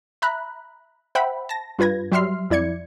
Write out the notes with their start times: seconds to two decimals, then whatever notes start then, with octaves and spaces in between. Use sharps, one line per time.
0.22 E5 A#5 B5 F#6
1.15 C5 E5 F#5 G5 B5
1.49 A5 A#6
1.79 G2 F4 B4 G#6 A#6
2.12 F#3 G3 E5 C6 F6 C7
2.50 F2 E4 D5 G#6 C#7